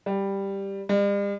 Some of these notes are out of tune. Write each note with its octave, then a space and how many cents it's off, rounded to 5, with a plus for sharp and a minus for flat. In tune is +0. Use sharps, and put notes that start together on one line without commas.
G3 +5
G3 +45